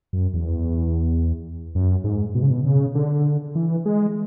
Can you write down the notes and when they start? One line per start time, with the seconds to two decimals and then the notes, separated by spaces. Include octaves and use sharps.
0.13 F#2
0.34 E2
1.75 F#2
2.04 G#2
2.35 B2
2.42 C#3
2.50 B2
2.65 C#3
2.95 D3
3.55 E3
3.85 G#3